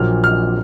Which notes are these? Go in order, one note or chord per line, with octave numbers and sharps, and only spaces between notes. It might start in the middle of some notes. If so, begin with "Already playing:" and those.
Already playing: A#1 A#2 F#3 F6
F6